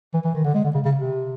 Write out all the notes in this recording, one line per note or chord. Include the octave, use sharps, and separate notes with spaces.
E3
E3
D#3
D3
G#3
D3
C#3
C#3
C3